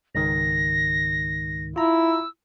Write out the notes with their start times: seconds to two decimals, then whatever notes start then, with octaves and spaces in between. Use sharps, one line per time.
0.15 C#2 G#2 D#3 A#6
1.76 E4 F4 A#5 E6